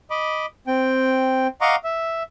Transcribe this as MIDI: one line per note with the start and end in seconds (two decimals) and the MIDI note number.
0.10 0.46 75
0.10 0.46 83
0.10 0.46 86
0.67 1.47 60
0.67 1.47 79
1.61 1.76 75
1.61 1.76 77
1.61 1.76 78
1.61 1.76 82
1.61 1.76 85
1.61 1.76 86
1.84 2.23 76